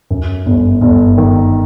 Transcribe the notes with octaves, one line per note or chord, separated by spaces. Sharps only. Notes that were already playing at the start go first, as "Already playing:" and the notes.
F#2
G1
G1
D#3